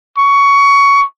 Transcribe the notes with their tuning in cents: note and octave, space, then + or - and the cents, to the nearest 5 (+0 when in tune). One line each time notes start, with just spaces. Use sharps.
C#6 +15